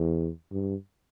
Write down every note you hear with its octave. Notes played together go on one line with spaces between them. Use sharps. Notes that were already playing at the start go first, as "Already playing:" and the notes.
Already playing: E2
G2